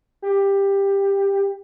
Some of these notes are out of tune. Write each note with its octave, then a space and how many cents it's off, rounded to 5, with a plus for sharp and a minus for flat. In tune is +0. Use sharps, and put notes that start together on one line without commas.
G4 +15